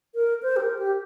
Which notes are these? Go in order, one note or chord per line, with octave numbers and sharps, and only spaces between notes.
A#4
C5
G4
A#4
G4